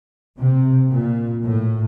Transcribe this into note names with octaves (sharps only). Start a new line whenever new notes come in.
C3
A#2
A2